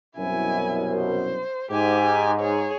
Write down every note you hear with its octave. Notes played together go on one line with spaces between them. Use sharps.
C2 F#2 B2 E4 G#5
C5
G#2 G4 G#5
G#4 C#5